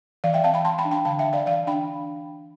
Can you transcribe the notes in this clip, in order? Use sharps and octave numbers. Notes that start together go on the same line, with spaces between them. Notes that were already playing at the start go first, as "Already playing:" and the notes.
E3 D5 F5
E5 G5
C4 F5 A5
G5 B5
E3 A5 C6
G5 B5
D4
G5 B5
D3 F5 A5
E5 G5
D3
D5 F5
E3 D5 F5
D4 G5 B5